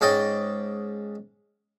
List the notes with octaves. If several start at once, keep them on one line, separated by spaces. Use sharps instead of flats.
G#2 C#4 D5 D#5 G5 D#6